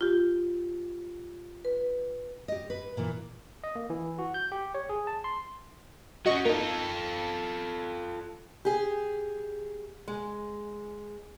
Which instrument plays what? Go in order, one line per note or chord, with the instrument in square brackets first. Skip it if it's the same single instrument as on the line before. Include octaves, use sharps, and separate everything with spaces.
[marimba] F4 G4
B4
[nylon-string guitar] G4 D#5
B4
A#2 E3
[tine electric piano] D#5
A#3
E3
F#4
G6
G4
C#5
G#4
A5
C6
[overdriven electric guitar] F#3 C#4 [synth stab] F#4 D#5 C#6
[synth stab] A#3 D#4 [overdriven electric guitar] F4 A4
[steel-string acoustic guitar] G4 G#4
G#3